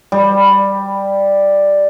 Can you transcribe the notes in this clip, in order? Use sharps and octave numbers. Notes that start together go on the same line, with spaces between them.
G3